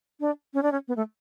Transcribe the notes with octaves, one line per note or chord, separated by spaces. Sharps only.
D4
C#4
D4
C#4
B3
A3